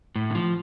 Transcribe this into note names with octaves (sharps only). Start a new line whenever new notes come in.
A2
D3
F3